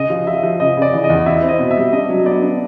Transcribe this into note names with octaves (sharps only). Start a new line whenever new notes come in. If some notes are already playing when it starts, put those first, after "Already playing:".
Already playing: C#3 D#5
F3
F3 E5
F3
C#3 D#5
C#3
D5
E3
D#5
E2
E4 E5
C4
D#5
B2
E5
G3
D4 D#5
F#3
B3 D5
D4